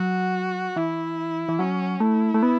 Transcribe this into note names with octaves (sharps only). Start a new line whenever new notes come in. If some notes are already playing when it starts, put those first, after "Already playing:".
Already playing: F#3 F#4
E3 E4
E3
F#3 C#4
A3 E4
A3
B3